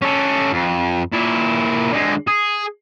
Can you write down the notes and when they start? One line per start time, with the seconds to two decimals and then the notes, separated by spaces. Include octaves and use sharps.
0.02 C#4 A4
0.53 F2
1.13 A#2 E4
1.91 D3 G#3
2.27 G#4